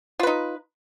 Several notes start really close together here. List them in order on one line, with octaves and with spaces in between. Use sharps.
F4 B4 D#4